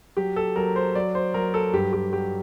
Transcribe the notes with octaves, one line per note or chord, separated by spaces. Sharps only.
F#3 G4
A4
F#3 A#4
C5
F#3 D5
C5
F#3 A#4
A4
G2 G4
G4
F#3 G4